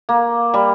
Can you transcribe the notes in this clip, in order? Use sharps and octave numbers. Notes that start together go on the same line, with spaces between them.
A#3
G3